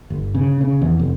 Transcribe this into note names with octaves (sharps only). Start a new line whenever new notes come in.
G1
C#3
C#3
E2
F1